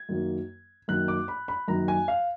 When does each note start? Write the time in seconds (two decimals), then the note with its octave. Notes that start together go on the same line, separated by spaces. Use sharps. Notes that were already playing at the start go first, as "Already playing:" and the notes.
Already playing: G#6
0.09 F#2 D#3 F#3 A#3
0.88 F#2 D#3 F#3 A#3 F#6
1.08 D6
1.28 B5
1.48 B5
1.68 F#2 D#3 F#3 A#3 A#5
1.88 G#5
2.08 F5